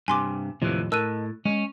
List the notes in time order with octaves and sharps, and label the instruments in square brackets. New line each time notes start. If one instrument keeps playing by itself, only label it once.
[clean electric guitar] G2 C3 [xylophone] G#5 C6 D6
[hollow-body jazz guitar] D#2 A2 F3 [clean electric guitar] C3 E3
[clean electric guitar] A2 [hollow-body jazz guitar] A#4 D#5 A5 [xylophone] E6 F#6 D#7
[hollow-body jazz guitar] G#3 [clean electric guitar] C#4